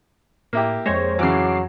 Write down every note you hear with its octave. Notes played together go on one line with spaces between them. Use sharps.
A2 A#3 E4 G4
F2 G#3 C5 C#5 G#6 A#6
C#3 E3 F#3 D6 C7